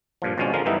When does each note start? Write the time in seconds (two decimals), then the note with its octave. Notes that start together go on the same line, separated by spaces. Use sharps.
0.22 G2 A#2 F3
0.38 G#1 B2 F3 G#3 C#4 D4
0.54 D3 F3 G#3 A#4
0.66 G2 E3 G3 B3 D#4 E4